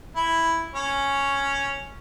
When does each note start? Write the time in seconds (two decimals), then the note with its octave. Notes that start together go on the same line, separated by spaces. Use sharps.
0.16 E4
0.75 C#4